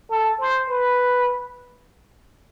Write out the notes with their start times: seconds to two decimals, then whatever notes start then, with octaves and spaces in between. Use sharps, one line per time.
0.10 A4
0.40 C5
0.69 B4